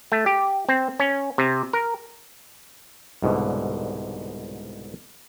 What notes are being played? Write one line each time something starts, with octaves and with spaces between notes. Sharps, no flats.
A3
G4
C4
C#4
C3
A#4
C2 G#2 B2 D3